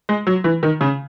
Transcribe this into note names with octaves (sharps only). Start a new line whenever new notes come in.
G#3
F#3
E3
D#3
C#3